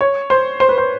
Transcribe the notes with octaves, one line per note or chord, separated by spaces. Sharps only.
C#5
C5
C5
B4
C5